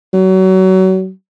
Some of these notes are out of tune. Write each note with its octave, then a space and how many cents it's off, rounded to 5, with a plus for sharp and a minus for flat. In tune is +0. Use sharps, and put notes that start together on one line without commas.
F#3 +30